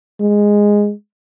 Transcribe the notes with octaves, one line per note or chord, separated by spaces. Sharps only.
G#3